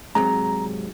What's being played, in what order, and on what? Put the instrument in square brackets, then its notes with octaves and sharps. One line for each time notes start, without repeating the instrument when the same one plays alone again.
[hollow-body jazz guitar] G#2 C3 F#3 [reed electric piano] A#5